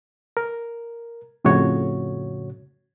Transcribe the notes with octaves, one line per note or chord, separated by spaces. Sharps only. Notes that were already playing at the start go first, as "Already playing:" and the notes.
A#4
F2 A2 C#3 F#4 C#5